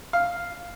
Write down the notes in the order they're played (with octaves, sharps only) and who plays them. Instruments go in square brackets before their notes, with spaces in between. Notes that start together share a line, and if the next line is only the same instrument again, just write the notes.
[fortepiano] F5